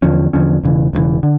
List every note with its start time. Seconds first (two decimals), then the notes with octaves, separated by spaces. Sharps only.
0.02 E2 D3 F3 C#4
0.33 E2 D3 F3 C#4
0.64 E1 D2 C#3 E3
0.93 E1 D2 C#3 E3
1.23 D3